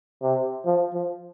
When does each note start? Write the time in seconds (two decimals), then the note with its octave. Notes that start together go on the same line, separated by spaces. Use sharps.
0.22 C3
0.66 F3
0.94 F3